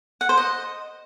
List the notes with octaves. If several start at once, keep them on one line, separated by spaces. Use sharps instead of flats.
F#5
C5
D#5